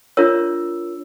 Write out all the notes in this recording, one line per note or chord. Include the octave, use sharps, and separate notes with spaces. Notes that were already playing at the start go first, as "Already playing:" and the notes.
D4 F4 A#4 C#5 E6